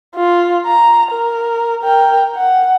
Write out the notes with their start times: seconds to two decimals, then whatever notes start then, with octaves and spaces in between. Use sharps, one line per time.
0.15 F4
0.67 A#5
1.11 A#4
1.83 A#4 G5
2.36 F#5